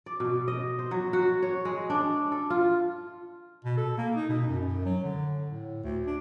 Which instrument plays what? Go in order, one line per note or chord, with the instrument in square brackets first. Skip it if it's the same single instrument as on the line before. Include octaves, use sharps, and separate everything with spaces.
[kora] D5
B2
D#5
C5
F#3
F#4
C#5
G#3
D4
A4
F4
[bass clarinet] B2
A4
A#3
D#4
B2
F#2
F#2
F#3
D3
A2
D2
D4